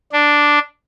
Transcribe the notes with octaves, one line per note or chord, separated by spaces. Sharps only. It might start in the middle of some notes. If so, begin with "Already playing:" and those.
D4